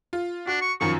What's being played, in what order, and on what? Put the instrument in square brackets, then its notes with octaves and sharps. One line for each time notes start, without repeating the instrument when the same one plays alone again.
[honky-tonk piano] F4
[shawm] D4 [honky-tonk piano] F#4
[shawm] C#6
[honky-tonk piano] F#2 D#3 F3 [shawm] C#6